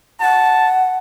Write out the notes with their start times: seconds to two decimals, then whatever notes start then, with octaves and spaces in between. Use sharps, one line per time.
0.21 F#5 A5